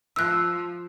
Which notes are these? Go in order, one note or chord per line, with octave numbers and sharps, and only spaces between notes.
F3 E6 F#6